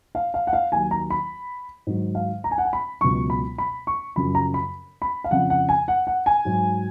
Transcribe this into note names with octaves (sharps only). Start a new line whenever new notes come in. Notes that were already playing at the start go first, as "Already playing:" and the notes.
F5
F5
F#5
F5
D#2 D#3 F#3 G#5
A#5
B5
G#2 D#3 F#3
F5
A#5
G#5
F#5
G#5
B5
C#2 B2 F#3 C#6
B5
B5
C#6
F#2 C#3 F3 B5
A#5
B5
B5
F5
F2 C#3 F3 F#5
F#5
G#5
F#5
F#5
G#5
G#2 F#3